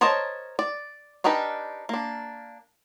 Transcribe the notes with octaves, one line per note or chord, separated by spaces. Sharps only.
A#4 C5 C#5 D#5 A5
D5
D4 D#4 G4 A#4 B4
A#3 D4